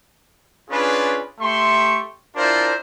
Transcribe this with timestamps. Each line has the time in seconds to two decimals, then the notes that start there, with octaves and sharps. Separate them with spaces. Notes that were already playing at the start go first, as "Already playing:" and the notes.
0.70 C#4 D4 F4 G#4 B4
1.40 A3 G4 E5 C6 C#6
2.36 D4 E4 F4 A#4 C5